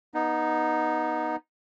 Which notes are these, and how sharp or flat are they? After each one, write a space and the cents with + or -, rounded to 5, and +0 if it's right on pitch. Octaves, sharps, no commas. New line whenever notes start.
B3 -20 D#4 +0